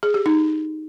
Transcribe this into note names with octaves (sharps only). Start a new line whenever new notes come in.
G#4
G4
D#4